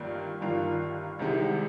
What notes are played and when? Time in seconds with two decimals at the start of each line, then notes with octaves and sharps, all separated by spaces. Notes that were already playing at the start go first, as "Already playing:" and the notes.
Already playing: G1 G2 D#3 A#3 F4
0.41 G1 G2 D#3 A#3 F4
1.19 C2 C3 D#3 G#3